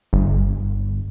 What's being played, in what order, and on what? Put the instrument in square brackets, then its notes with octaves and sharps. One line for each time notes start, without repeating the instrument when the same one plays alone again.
[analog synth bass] G1